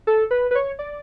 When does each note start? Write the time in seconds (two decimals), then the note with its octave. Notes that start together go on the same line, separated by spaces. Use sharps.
0.07 A4
0.31 B4
0.51 B4
0.55 C#5
0.79 D5